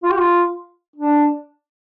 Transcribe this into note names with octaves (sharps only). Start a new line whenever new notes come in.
F4
G4
F4
D4